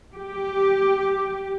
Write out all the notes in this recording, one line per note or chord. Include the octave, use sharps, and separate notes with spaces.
G4